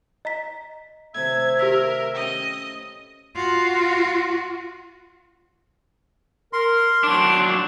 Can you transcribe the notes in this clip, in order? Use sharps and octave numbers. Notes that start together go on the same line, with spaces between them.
D#5 A#5 B6
A2 C3 D#3 E5 G#6
G4 A#4 F5 E6 B6
C#4 D#5 G5 D#6
F4 F#4
A#4 C6
F#3 D4 D6